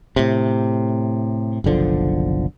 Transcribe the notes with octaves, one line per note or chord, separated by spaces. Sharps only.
A2 C3
F#1 B1 D3 F3